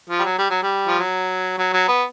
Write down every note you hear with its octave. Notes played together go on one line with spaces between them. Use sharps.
F3
G3
F#3
G3
F#3
G3
F3
F#3
F#3
F#3
B3